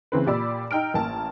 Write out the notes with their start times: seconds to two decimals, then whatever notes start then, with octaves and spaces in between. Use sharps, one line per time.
0.12 C#3 E3 C4 B4
0.26 A#2 G4 D5 B5 E6
0.71 D#4 G5 F6 D7
0.94 A1 A#3 A5